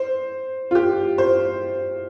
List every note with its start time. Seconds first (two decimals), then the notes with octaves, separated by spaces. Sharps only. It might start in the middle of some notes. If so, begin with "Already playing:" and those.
Already playing: C5
0.71 F4
0.75 G4
1.18 C5